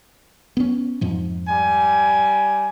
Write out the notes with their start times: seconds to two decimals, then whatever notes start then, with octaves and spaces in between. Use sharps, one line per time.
0.57 B3 C#4
1.01 F2 G#2 F3
1.48 G3 G#5